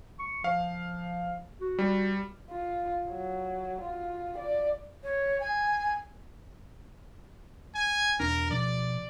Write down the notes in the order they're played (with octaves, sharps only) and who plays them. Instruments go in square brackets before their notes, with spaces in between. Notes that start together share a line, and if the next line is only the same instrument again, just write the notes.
[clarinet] C#6
[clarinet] F3 [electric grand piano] F5
[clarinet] F#4
[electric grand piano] G3
[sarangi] F4
F#3
F4
D5
[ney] C#5
G#5
[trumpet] G#5
[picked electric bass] E1 D4 [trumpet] A#4
[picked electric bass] B2 F3 [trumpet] D5